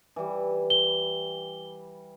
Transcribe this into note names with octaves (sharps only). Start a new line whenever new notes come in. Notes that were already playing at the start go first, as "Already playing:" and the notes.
E3 G3
G7